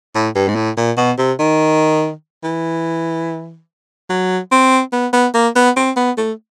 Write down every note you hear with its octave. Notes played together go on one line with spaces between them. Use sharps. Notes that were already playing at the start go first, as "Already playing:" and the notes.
A2
G2
G#2
A2
A#2
B2
C3
D#3
E3
F#3
C4
B3
B3
A#3
B3
C4
B3
A3